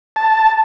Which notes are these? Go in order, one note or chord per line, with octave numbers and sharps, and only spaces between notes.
A5